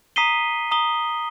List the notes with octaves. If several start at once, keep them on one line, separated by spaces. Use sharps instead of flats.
A#5 D#6 B6 C7 D#7 G7
A#5 D#6 G7